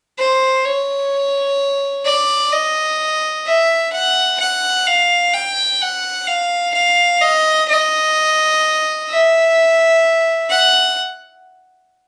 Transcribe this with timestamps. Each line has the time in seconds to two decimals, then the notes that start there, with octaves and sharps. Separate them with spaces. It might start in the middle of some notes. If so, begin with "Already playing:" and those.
0.18 C5
0.65 C#5
2.05 D5
2.53 D#5
3.46 E5
3.93 F#5
4.40 F#5
4.87 F5
5.34 G5
5.81 F#5
6.27 F5
6.74 F5
7.21 D#5
7.69 D#5
9.09 E5
10.49 F#5